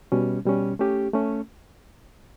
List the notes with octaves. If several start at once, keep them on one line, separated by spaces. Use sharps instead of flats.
B2 G3 C#4
B2 G3 C#4
A3 C#4 G4
A3 C#4